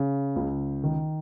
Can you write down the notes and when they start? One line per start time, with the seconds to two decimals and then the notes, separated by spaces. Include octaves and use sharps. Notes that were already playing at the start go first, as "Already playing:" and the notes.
Already playing: C#3
0.36 C#2
0.84 D#3